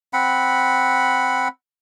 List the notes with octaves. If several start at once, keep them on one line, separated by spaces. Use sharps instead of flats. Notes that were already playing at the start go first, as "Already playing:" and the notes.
C4 F#5 B5